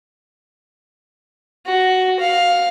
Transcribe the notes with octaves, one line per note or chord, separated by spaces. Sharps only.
F#4
F5